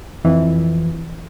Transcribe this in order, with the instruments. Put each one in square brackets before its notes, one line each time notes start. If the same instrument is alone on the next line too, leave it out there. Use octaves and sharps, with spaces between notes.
[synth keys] F2 E3